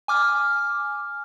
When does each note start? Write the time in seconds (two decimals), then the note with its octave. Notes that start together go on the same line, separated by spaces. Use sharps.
0.08 G#5 D6 F6